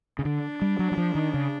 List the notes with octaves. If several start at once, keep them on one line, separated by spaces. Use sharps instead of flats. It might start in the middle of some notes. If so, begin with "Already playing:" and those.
C#3
D3 D4
G3
F#3
F#3
F3
D#3
C#3